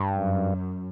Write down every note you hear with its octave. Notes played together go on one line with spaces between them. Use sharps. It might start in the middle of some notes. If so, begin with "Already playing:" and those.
Already playing: G2
F#2